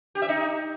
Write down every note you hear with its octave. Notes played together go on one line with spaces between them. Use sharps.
G4
E5
D#4